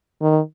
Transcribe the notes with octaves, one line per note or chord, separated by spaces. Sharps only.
D#3